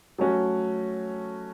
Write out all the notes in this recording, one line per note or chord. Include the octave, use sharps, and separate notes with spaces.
F#3 A3 C#4 F#4